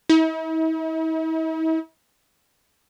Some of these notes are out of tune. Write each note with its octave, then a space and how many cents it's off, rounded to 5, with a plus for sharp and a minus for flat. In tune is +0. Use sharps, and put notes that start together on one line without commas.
E4 -45